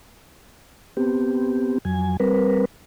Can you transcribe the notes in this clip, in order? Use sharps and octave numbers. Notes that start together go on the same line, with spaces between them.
B3 C4 G4
F2 F#3 G#5
G3 C4 A#4 B4